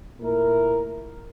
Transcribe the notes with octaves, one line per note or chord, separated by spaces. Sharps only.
A#2 A3 E4 A#4